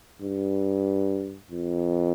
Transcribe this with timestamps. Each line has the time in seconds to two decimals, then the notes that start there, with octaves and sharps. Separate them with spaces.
0.22 G2
1.51 F2